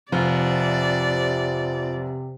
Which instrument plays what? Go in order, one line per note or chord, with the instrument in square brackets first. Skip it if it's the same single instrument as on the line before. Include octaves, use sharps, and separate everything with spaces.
[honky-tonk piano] F1 [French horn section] C3 [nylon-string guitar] F3 [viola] D5